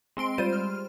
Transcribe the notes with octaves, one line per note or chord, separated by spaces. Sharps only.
G#3 C4 C6 D7
G3 F4 C5 D#7
F6